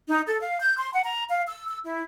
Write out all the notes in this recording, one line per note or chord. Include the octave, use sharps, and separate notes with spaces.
D#4
A4
F5
G6
C6
F#5
A#5
F5
E6
E6
E4